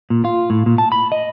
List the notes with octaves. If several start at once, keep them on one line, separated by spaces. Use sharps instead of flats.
A#2
F4
A2
A#2
A5
B5
D#5